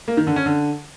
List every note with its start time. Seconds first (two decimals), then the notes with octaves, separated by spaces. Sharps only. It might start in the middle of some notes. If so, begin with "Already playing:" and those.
0.08 A#3
0.17 D#3
0.27 D3
0.36 C#4
0.46 D3